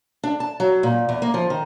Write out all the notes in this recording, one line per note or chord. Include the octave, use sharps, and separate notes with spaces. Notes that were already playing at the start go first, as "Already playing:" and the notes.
D4
A5
F#3
A#2
E2
A#3
F3
D#3